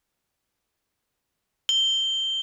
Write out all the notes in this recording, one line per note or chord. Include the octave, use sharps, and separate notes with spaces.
G7